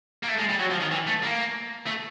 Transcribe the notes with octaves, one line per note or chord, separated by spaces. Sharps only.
A#3
A3
G#3
G3
F#3
F3
D#3
E3
A3
A#3
A3